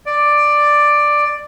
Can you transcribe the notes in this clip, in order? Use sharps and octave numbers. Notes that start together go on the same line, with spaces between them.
D5